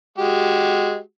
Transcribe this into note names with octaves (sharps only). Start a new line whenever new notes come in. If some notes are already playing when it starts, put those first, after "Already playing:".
G#3 F#4 G4